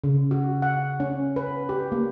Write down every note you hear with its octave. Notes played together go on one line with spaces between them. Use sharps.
C#3
F#4
F#5
C#4
B4
G4
A#3